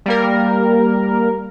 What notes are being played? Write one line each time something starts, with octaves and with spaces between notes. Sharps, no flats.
G3 A#3 A#4